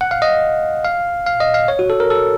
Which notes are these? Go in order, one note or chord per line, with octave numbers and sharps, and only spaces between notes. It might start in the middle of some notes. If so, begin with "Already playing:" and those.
F#5
F5
D#5
F5
F5
D#5
F5
C#5
F#4
A4
A#4
A4